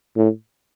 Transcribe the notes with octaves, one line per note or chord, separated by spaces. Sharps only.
A2